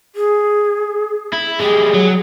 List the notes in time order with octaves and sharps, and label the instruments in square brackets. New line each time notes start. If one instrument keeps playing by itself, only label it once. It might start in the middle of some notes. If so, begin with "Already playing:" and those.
[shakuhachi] G#4
[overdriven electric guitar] E4
[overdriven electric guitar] G3 G#3 [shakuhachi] G#4
[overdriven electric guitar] F#3